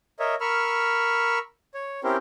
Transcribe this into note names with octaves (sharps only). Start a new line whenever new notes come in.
A#4 C#5 D#5 E5
A#4 B5 C#6 E6 F6
C#5
C4 C#4 E4 G4 A#4 C5